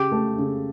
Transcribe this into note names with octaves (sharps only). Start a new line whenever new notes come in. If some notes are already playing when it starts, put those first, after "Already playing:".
Already playing: C#3 G4
A3
C#3